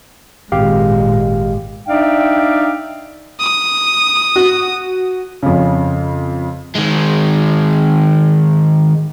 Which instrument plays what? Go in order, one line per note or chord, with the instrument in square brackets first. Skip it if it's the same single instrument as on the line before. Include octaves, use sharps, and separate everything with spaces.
[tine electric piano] G#1 G4 F5 [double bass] A#2 G#3
[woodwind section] D4 D#4 D5 E5 F5 G5
[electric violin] D#6
[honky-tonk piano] F#4
[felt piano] F2 C#3
[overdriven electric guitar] D#3 G#3